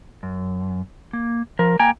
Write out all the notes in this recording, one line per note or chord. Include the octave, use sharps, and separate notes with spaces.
F#2
A#3
F3 A#4
A#3 G5 G#5 A#5